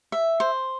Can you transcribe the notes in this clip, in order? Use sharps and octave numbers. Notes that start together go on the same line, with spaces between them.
E5
C5